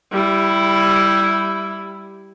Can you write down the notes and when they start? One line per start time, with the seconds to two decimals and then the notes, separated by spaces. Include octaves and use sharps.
0.12 G3 E4